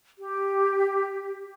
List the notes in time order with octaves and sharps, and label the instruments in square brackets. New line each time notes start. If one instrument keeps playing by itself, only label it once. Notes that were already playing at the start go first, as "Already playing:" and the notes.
[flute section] G4